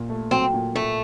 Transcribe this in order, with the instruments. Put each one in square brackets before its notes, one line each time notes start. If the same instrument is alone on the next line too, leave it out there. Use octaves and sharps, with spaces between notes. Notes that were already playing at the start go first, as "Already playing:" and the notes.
Already playing: [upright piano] A#2
A3
[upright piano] F#3 [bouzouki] C4
[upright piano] A#2
[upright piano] A#2 [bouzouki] A3